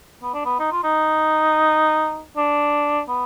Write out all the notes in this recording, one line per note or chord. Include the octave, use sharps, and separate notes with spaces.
B3
D4
B3
D#4
F4
D#4
D4
B3